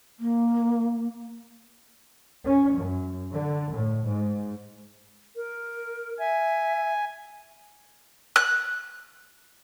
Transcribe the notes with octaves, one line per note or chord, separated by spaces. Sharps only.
A#3
C#4
F#2
D3
A2
G#2
A#4
E5 G#5
F#6